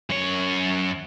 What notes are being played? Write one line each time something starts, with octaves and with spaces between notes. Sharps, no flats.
F#2 C#5